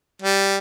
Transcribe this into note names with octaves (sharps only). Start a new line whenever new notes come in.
G3